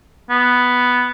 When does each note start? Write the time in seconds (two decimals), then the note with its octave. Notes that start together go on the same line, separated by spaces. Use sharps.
0.30 B3